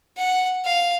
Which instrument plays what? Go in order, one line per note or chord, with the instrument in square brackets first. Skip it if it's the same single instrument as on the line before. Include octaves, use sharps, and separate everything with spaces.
[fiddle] F#5
F5